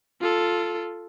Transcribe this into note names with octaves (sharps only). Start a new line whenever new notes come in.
F4 A4